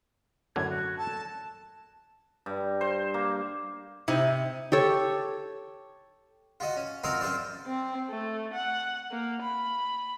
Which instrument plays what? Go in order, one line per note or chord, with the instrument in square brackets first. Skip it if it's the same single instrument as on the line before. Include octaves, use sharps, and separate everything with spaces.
[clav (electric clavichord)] F#2 A2 D3 [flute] G#6
[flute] F#4
[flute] A4 [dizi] A5
[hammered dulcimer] G2
C5
A#3
[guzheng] C3 [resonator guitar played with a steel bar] D#4 E4
[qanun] G4 A4 C#5
[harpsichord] F4 F#4 D#5
C#4
C4 F4 F#4 A#4 D#5 F5
F#2 F4 C5 D5
[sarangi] C4
A3
F#5
A#3
B5